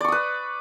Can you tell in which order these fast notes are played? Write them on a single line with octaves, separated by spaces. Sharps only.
D5 C#6 D#6 B4